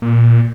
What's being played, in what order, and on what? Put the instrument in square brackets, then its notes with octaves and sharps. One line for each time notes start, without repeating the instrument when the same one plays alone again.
[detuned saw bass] A#2